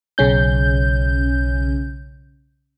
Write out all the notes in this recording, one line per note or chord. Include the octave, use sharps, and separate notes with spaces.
B1 C#3 C#4 G6